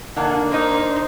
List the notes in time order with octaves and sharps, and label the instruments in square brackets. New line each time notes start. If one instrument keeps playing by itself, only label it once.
[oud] F2 D3 D4 [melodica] A#3 [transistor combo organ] D#4 F#5 G#5
[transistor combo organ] D4 C5 [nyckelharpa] D#4 [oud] A#4 D#5